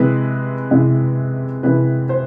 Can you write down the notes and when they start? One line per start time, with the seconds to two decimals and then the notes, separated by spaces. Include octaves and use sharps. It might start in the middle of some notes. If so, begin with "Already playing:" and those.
Already playing: C3 E3 G#3 B4
0.71 C3 E3 G#3
1.63 C3 E3 G#3 B4
2.09 C5